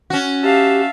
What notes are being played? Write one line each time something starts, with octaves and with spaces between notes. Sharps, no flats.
C#4 F#4
G4 E5 F5 A5